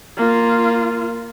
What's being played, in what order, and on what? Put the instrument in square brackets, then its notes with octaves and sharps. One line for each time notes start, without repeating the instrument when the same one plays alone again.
[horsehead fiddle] A#3 F4